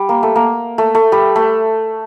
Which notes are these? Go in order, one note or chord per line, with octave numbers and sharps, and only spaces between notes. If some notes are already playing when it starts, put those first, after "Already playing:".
Already playing: G3
A#3
A3
A#3
A3
A3
G3
A3